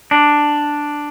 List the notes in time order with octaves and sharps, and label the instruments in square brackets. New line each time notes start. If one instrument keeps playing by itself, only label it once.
[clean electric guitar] D4